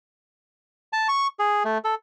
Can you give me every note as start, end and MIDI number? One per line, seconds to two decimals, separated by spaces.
0.93 1.08 81
1.09 1.27 85
1.39 1.63 68
1.65 1.78 57
1.84 1.95 69